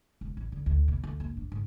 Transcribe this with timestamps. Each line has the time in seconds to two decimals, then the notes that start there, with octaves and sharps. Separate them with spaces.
0.21 E1
0.37 A1
0.52 D3
0.66 D2
0.88 B2
1.04 D2
1.20 F#1
1.37 D4
1.52 G#2